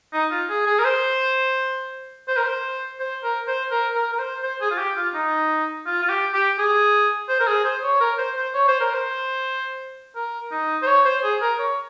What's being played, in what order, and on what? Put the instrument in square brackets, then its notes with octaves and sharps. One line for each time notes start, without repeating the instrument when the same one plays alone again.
[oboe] D#4
F4
G#4
G#4
A#4
C5
C5
A#4
C5
C5
A#4
C5
A#4
A#4
A#4
C5
C5
G#4
F4
G4
F4
D#4
F4
F4
G4
G4
G#4
C5
A#4
G#4
C5
C#5
A#4
C5
C5
C#5
C5
A#4
C5
A#4
D#4
C5
C#5
C5
G#4
A#4
C#5